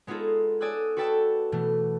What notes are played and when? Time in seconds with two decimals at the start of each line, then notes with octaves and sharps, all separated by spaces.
0.07 G#3 B3 D#4 F4 G#4 A4
0.61 A4 D5 G#5 D#6 E6 F#6
0.97 F#4 A4 B4 G5 A5 E6
1.52 B2 E3 A3